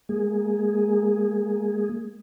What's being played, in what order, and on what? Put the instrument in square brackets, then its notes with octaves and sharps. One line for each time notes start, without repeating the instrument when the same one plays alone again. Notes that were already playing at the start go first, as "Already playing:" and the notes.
[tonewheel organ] G#3 A#3 G#4